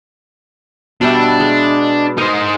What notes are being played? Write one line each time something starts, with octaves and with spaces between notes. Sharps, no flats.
B2 G3 D4 E5
G#3
D#4 A#4 C5